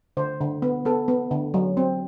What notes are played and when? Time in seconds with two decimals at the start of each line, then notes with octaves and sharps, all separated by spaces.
0.17 D3 C5
0.41 D3
0.62 B3
0.85 B3 A4
1.08 B3
1.31 D3
1.54 F#3
1.77 C4